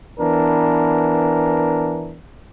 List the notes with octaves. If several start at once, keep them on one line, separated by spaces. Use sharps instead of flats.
E3 B3 D4 A#4